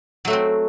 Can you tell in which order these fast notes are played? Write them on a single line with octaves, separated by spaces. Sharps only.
F#3 A3 F#4 C4